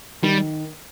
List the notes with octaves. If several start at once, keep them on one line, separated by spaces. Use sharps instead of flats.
D#3 G3